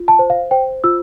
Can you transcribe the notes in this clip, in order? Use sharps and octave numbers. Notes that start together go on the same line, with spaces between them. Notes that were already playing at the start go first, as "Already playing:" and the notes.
Already playing: F4
A5
C5
F5
C5 G5
F4 E6